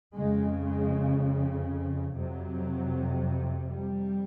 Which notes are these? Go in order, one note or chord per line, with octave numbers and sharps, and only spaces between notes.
F2 C#3 G#3
G#3
F2 C3 F#3
G3